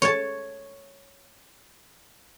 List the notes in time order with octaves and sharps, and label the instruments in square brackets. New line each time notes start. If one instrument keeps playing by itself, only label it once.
[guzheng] C#5 A5